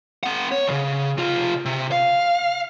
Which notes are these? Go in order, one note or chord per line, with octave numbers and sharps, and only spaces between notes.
C4 F#5
C#5
C#2 C#3
C3 F4
C3
F5